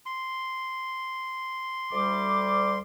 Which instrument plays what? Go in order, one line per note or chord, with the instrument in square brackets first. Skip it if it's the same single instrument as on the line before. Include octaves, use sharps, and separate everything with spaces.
[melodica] C6
[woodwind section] D2 G3 D6